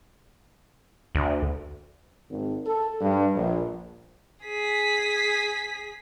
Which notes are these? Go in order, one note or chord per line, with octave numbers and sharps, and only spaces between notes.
D2
G#1
A4
G2
A#1
G#4 B6